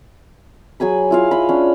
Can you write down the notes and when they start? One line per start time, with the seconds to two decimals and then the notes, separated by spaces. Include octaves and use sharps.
0.80 F#3 G#4 G#5 B5
1.11 E4 F4 F5
1.31 D#5 B5
1.49 C#4 D4